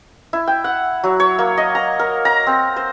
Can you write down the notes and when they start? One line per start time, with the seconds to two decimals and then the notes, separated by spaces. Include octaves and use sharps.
0.33 E4
0.48 G5
0.64 F#5
1.04 F#3
1.20 C#5
1.39 A#3
1.58 D#5
1.75 A#5
1.99 A#4
2.25 A#5
2.47 C4
2.76 C5